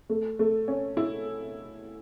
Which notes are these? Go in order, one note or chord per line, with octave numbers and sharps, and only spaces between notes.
A3
A3
C#4
E4